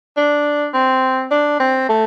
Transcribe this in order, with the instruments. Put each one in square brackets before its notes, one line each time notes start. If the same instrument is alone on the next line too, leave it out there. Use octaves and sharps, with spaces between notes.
[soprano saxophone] D4
C4
D4
C4
A3